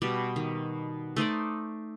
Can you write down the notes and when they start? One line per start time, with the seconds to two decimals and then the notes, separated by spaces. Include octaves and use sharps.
0.02 B2 G3
0.36 D#3
1.16 A3 D#4 C5 D5